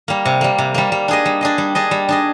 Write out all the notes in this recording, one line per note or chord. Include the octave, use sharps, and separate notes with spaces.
G3 A#3
C3
G3 A#3
C3
G3 A#3
G3
D4 G#4 D#5
G3
D4 G#4 D#5
G3
D4 G#4 D#5
G3
D4 G#4 D#5